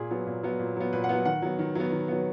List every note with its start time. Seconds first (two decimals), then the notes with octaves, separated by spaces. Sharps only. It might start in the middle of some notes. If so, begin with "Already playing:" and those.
Already playing: A#2 G#4
0.11 F#3 B3
0.26 A#2
0.43 F#3 B3
0.59 A#2
0.76 F#3 B3
0.93 A#2 B4
1.04 F#5
1.09 F#3 B3
1.25 D#3 F#5
1.42 F#3 B3
1.59 D#3
1.75 F#3 B3
1.92 D#3
2.08 F#3 B3